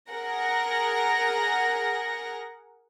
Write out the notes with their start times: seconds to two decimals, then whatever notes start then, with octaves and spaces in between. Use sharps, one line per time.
0.12 G#4 A#4 F#5 A#6